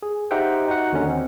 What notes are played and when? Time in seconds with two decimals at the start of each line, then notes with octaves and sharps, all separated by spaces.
0.03 G#4
0.31 D#4 G4 C5 E5 F#5 G5
0.68 D#4 F#4 F#5
0.92 D#2 D3 C#4
1.06 C4